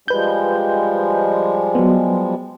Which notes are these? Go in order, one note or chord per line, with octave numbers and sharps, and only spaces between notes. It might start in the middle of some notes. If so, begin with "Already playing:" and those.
F3 G3 G#3 B4 G6
F#3 B3